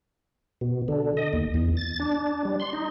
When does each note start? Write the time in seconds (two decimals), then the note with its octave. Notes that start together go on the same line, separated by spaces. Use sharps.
0.61 B2
0.88 D3
1.17 D#5
1.33 D#2
1.54 E2
1.77 A6
2.00 D4
2.45 G3
2.60 C6
2.73 D#4